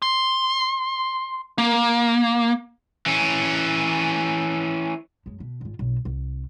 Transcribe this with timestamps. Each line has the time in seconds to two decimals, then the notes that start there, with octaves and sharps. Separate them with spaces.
0.02 C6
1.58 A#3
3.06 E3 C#4
5.26 F#2 G#3
5.40 B2
5.61 G#1 F4
5.79 B1 C4
6.05 C2